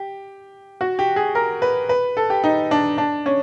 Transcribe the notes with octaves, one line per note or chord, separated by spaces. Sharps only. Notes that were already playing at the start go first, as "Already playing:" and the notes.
Already playing: G4
F#4
G4
G#4
A#4
B4
B4
A4
G4
D#4
D4
D4
C#4